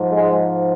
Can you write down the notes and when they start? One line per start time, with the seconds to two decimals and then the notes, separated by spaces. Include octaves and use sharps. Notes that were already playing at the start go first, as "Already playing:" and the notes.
Already playing: G#2 F3
0.11 G#3